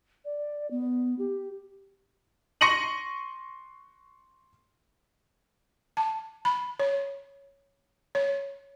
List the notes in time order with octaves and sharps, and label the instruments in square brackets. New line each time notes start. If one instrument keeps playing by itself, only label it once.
[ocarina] D5
B3
G4
[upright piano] C6 C#6 A#6 C#7 D#7 F#7
[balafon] A5
B5
C#5
C#5